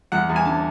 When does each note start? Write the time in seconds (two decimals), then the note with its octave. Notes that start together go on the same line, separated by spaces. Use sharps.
0.12 E2 F#5
0.29 E2
0.36 G#5
0.45 D3 A5